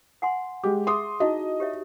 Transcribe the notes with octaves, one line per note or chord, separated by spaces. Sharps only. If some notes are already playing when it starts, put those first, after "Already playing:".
F#5 G#5 C6
G#3 G4 D6
G#4 E5 C6 D#6
D#4 E4 F#4 D#5
G4 C#5 E5